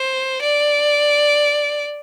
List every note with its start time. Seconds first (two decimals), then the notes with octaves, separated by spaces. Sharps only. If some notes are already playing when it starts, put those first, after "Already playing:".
Already playing: C5
0.41 D5